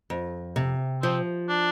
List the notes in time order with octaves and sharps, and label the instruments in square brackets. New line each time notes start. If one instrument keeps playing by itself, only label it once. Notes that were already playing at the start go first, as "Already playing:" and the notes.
[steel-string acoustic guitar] F2
C3
[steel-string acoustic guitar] F3 [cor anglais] C4
[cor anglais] D4